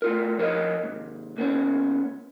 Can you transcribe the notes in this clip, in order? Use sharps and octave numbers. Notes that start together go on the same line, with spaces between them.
A2 F4 A#4
F3 A#4 B4 C#5 D#5
D#2 G#2
C#2 A#3 B3 C#4